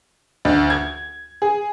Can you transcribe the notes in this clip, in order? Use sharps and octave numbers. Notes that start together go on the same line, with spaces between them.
D2
G#6
G#4